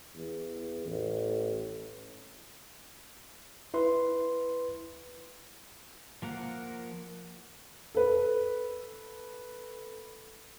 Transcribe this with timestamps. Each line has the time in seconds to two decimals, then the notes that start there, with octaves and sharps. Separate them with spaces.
0.15 E2
0.86 A1
3.74 E4 B4 C6
6.22 F3 A#3 A#4 F#5
7.95 A4 B4